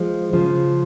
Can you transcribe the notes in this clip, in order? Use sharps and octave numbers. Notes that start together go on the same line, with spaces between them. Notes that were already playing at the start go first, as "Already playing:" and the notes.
Already playing: F3 G#3
C#3 F3